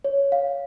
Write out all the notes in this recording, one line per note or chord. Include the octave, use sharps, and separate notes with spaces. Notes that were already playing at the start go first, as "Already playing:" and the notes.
C#5
F5